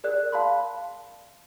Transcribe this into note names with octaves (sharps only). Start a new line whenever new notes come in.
G#4 A#4 D5 F#6
F5 A5 B5 C6